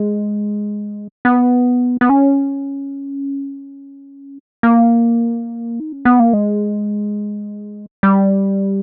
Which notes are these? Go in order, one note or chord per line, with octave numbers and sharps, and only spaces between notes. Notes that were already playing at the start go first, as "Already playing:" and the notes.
Already playing: G#3
B3
B3
C#4
A#3
D#4
C#4
B3
A#3
G#3
G3